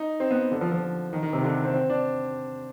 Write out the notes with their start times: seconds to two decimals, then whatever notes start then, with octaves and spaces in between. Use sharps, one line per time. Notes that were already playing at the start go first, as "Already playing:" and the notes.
Already playing: D#4
0.20 C4
0.31 B3
0.51 D3
0.61 F3
0.72 F3
1.13 D#3
1.23 D#3
1.33 C3
1.43 D3
1.64 C4
1.74 C4
1.90 D4